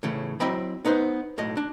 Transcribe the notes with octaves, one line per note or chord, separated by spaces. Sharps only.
A2 C#3 E3
F#3 C4 E4 D#5 G5 B5
B3 D#4 B4 C5
B1 A2 D#5
D4